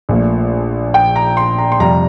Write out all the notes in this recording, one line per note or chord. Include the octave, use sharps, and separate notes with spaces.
A#1 A#2 A3
G5
A#5
C6
A#5
C6
F2 C3 G3 A#5